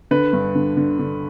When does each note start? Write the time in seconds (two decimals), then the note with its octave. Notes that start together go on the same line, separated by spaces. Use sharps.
0.11 D3 B4
0.33 G2
0.55 D3
0.77 D3
0.99 D3